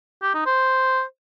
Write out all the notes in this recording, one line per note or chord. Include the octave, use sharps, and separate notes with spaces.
G4
D#4
C5